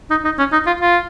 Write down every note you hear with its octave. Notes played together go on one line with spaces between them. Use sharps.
D#4
D#4
C#4
D#4
F4
F4